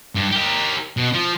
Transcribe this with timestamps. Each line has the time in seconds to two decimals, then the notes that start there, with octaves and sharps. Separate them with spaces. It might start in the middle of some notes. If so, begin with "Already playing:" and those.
0.15 G2
0.32 G4 A#4
0.97 B2
1.13 F3